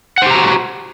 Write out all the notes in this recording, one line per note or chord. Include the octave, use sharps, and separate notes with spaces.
F#4 G4 C5 F#5 A#5